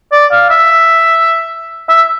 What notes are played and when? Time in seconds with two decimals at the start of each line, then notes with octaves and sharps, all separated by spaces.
0.12 D5
0.32 F5
0.50 E5
1.89 E5